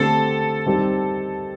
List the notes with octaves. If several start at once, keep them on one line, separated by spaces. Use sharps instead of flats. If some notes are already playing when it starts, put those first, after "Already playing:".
Already playing: D3 A3 C4 G4 A4
D#3 G3 C4 G4 C5